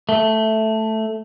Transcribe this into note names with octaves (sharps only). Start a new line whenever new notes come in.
A3